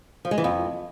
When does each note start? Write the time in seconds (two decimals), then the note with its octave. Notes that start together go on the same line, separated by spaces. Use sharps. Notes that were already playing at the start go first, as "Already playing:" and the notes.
0.25 F3
0.31 G#3
0.38 E3
0.44 F2